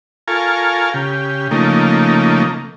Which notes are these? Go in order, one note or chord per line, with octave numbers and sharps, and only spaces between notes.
F4 A4 A#4 F5 G#5 C#6
C#3 G4
C#3 F3 A3 A#3 D#4